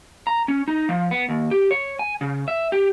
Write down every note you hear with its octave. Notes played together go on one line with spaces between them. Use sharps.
A#5
C#4
D#4
F3
B3
D#2
G4
C#5
G#5
C#3
E5
G4